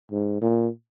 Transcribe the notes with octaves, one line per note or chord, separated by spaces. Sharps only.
G#2
A#2